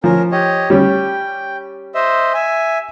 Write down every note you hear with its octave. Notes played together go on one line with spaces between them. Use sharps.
F3 C#4 A#4
G4 C#5 D#5
G3 C#4 G5
C5 D#5 E5
E5 G#5